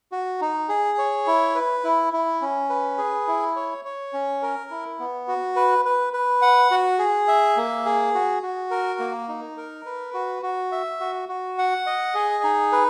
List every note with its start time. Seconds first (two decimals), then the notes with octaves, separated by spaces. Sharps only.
0.12 F#4
0.41 D#4
0.69 G#4
0.98 C#5
1.27 E4
1.55 B4
1.84 E4
2.13 E4
2.41 C#4
2.70 B4
2.98 G#4
3.27 E4
3.56 C#5
3.85 C#5
4.13 C#4
4.42 A#4
4.71 E4
4.99 B3
5.28 F#4
5.56 B4
5.85 B4
6.13 B4
6.42 F#5
6.71 F#4
6.99 G#4
7.28 E5
7.57 A#3
7.86 G#4
8.15 F#4
8.43 F#4
8.71 A#4
8.99 A#3
9.29 D#4
9.57 A#4
9.86 B4
10.14 F#4
10.43 F#4
10.72 E5
11.00 F#4
11.29 F#4
11.58 F#5
11.87 D#5
12.15 G#4
12.44 D#4
12.72 B4